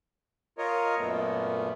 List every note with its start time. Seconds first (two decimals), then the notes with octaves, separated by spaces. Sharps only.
0.58 F4 A#4 C#5 D#5
0.99 F#2 A#2 A3 B3